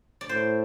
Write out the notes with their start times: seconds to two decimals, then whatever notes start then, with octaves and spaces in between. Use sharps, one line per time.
0.21 D5
0.29 A2 C5